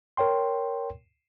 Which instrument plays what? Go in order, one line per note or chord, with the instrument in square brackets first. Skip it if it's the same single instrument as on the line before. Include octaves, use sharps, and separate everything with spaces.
[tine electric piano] A#4 C#5 G5 C6